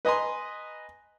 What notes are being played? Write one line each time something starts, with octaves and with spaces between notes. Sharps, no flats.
B4 D#5 G#5 A#5 C6